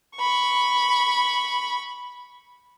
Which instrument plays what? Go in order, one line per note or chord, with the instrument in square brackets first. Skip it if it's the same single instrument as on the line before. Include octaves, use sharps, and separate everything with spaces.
[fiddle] B5 C#6